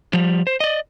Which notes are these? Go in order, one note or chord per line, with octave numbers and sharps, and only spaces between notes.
F3 G3
C5
D5 D#5